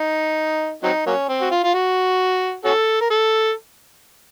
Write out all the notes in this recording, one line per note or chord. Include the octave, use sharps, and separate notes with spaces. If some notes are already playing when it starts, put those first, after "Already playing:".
Already playing: D#4
F#3 C4 D#4
F#3 A#3 C#4
C4
F#4
F4
F4
F#4
C#4 F#4 A4
A#4
A4